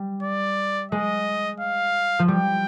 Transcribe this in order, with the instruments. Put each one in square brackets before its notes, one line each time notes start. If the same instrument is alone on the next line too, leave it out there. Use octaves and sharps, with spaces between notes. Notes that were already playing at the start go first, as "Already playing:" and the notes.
Already playing: [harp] G3
[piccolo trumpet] D5
[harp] G#3 [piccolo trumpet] D#5
[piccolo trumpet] F5
[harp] F3
[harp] G3 [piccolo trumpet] G5